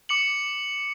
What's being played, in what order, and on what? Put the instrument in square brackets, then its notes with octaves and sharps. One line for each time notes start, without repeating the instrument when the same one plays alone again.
[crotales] D6 C#7 F#7